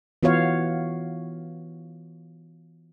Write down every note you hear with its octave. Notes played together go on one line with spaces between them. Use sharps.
E3 B3 F4 F#4 C#5 F5